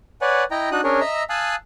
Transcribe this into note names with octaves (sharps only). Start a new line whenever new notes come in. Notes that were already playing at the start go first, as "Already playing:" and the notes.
B4 C#5 D5 F#5 G#5
E4 D#5 G5 A#5
D4 D#4 F#4 D#6 F#6
C#4 D4 G#4 A#4 C#5
D#5 E5 A#5 E6
F5 G#5 A5 D#6 E6 F#6